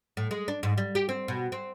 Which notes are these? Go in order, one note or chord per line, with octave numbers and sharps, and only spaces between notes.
A2
G#3
D4
G#2
G3
G4
C4
B2
C4